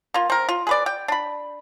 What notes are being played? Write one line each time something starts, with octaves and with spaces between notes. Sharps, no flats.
A#3 F4
C4 A#4
F4
G#4 B4 D5
G5
D4 B5